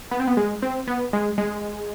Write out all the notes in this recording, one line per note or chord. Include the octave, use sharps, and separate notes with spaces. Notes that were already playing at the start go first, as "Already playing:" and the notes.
B3
C4
B3
G#3
C4
B3
G#3
G#3